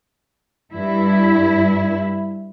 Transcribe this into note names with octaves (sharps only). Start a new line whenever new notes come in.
G2 E4